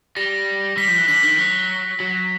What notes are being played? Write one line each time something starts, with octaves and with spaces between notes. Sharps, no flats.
G3 A#6
G3 B6
F3
E3
D3 B6
D#3
F#3
F#3